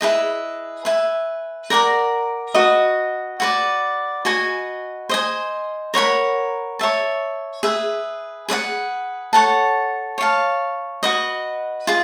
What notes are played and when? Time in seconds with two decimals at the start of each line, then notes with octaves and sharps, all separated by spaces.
0.01 E4 G#4 B4 D#5
0.85 B4 E5 G#5
1.70 A#4 D5 F#5 A#5
2.54 F#4 B4 D#5
3.40 F#4 B4 D5
4.25 F#4 B4 D#5 G#5
5.09 C5 D#5 G#5
5.94 A#4 C#5 F#5 B5
6.79 C#5 E5 A5
7.63 G#4 B4 E5
8.49 G#4 B4 D5 F#5
9.33 A4 C#5 F#5 A5
10.18 C#5 F5 A5
11.03 F#4 B4 D#5
11.87 F4 G#4